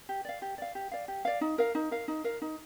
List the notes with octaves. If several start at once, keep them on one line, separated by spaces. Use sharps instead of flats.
G4
D5 F5
G4
D5 F5
G4
D5 F5
G4
D5 F5
D#4
A#4 F5
D#4
A#4 F5
D#4
A#4 F5
D#4